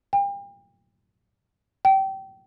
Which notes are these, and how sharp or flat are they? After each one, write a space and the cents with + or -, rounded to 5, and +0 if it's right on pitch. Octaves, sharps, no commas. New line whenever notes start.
G5 +35
G5 -25